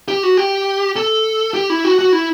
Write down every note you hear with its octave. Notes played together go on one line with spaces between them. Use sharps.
G4
F#4
G4
A4
G4
E4
F#4
F#4
E4